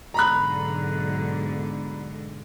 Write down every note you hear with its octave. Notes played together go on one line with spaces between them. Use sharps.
B1 G#2 D3 A#5 B5 F#6